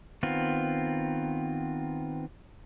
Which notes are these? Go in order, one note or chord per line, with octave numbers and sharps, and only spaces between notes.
D#3 B3 C4 F4